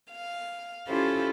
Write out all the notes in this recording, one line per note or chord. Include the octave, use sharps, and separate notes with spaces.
F5
C#4 E4 F4 G4 A4 C5